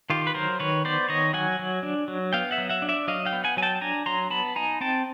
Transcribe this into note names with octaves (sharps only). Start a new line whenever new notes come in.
D#3 F4 G4
B4
F#3 A#4 C5
D#3 B4 C#5
B3 C5 D5
D#3 C#5 D#5
F#3 F#5 G#5
F#3
D4
F#3
B3 F5 G5
E5 F#5
F#3
E5 F#5
D4
D5 E5
F#3 D#5 F5
F5 G5
B3
F#5 G#5
F#3 G#5
G5 A5
D4 G#5 A#5
F#3 A#5 C6
B3 A5 B5
D#4 G#5 A#5
C4 G5 A5